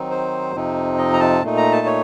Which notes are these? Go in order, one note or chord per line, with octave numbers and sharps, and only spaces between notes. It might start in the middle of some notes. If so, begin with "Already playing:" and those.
Already playing: D#3 F#3 C4 D#4
C5
F2 C3 F3 C4 D#4
D#5
A#5
A5
A#2 A3 D#4
A#5
A5
C#5